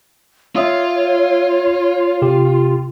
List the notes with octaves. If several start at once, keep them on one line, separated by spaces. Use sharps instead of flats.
F4 C#5 E5 D#6 E6
C3 G4